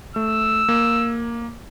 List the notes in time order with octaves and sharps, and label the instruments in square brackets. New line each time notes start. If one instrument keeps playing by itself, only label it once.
[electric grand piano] A3 [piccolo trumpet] E6
[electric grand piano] A#3